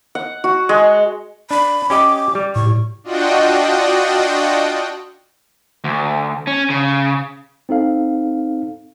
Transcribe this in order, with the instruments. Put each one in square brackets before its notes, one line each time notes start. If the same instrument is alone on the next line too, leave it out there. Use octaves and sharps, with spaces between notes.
[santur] F#5
F#4
G#3
[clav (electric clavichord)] D4 [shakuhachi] B5
[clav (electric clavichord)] C#4 G4 D#5 [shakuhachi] D6
[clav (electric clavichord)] G3
[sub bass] A2 [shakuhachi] C#6
[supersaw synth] D4 F4 F#4 D#5 F#5 G5
[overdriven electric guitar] D2
C#4
C#3
[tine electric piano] C4 D#4 A4 F5